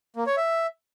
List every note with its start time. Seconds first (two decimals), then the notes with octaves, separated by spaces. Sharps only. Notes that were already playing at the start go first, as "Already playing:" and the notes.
0.16 A#3
0.27 C#5
0.37 E5